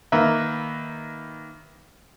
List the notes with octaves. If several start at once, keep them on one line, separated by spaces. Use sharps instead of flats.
D#3 A#3 B4 E5